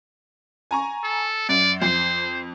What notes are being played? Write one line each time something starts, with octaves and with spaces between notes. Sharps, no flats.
G#5 A#5 C#6
A4
F#2 D5
F2 C5 C7